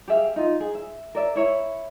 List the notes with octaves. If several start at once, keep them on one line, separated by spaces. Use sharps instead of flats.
G4 G#4 E5 F5
D#4 F4
G#4
E5
A#4 D5 E5
E4 C#5 E5